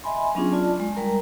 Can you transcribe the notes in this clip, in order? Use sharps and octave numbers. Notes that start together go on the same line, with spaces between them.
D#5 E5 G#5 B5 C6
F#3 B3 C#4 D4 F4 G#4
F4 D5 A5
G#3
G3 A#4 A#5